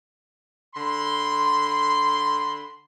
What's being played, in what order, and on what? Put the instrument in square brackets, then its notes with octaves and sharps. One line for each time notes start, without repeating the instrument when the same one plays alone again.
[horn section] D3 B5 C6